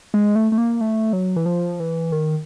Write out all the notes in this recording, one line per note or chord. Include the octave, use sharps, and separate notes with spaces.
G#3
A3
A3
A#3
A3
F#3
E3
F3
E3
D#3